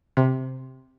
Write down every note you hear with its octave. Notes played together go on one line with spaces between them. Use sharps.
C3